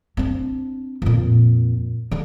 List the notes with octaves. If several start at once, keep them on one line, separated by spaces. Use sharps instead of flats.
C4 D4
F2 A#2
D3 D4